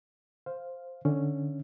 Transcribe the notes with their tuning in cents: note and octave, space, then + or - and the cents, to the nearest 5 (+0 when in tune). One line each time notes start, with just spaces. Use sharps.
C5 +0 F5 +0
D3 +10 C#4 +0 E5 +15